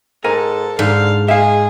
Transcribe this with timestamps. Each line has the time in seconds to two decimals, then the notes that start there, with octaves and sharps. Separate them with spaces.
0.24 G#2 A4 A#4 G#5
0.79 G#2 D3 F5
1.28 G#3 G#4 E5 F5